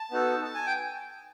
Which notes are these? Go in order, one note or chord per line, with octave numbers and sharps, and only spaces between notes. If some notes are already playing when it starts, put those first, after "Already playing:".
Already playing: A5
B3 D#4 F#4 A4
A5
G#5
G5